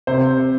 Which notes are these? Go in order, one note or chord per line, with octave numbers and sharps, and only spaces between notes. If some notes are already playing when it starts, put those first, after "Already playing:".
C3 C5